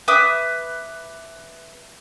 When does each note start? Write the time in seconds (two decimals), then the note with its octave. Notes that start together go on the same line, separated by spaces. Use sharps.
0.08 B4 E5 D6 D#6